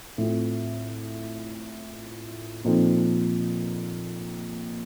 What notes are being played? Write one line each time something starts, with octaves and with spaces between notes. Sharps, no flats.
A2 A3 C4 F4
A#2 F3 C4 D#4 A4